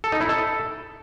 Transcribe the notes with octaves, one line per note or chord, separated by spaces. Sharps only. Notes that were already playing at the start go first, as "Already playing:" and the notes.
A4
D#4
E4
A4